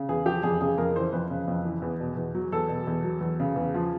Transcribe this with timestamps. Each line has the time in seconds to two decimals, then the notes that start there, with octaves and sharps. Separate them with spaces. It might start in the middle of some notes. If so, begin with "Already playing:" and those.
Already playing: C#3
0.09 E2 G#4
0.26 F3 G4
0.43 F2 G#4
0.61 C#3 G#4
0.78 F2 A#4
0.96 E3 C5
1.12 F2 B4
1.30 C#3
1.48 F2
1.65 E3
1.82 E2
2.00 B2
2.17 E2
2.35 F#3
2.52 E2 A4
2.69 B2
2.87 E2
3.04 F#3
3.21 E2
3.40 C#3
3.56 E2
3.74 F3